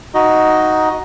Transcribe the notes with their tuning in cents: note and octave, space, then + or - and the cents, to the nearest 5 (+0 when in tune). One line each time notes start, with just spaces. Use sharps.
D#4 +5 F#4 +0 D#5 +5